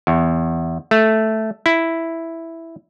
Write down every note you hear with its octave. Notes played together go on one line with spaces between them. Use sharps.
E2
A3
E4